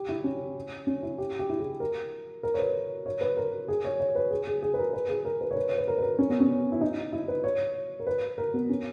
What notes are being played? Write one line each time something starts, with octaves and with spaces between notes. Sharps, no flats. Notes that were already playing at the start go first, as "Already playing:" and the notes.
Already playing: G4
E4
C#4
C#4
E4
G4
G4
E4
G#4
A#4
A#4
C#5
B4
C#5
B4
A#4
G#4
C#5
C#5
B4
G#4
G#4
G#4
B4
A#4
B4
G#4
A#4
B4
C#5
B4
C#5
B4
A#4
B4
A#4
C#4
B3
C#4
E4
D#4
E4
B4
C#5
A#4
B4
A#4
B3
C#4